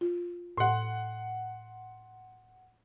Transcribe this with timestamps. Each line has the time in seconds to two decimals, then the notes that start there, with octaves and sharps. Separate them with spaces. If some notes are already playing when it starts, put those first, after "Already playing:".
0.01 F4
0.57 A2 F#5 C6